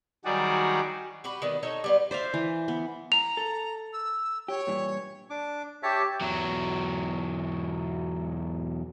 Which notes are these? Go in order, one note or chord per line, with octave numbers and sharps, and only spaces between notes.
D#3 F#3 G3 F#4 G#4 D5
F#4 G4 B4
D#3 G3 B3
D#4 A4 C#5
G3 B3 F4
C5 D5 E5 F5
E3
B3
A#5 F7
A4
E6
G4 C#5
G2 A#2 E3
D4 D6
G4 C#5 E5 A5
E2 F#3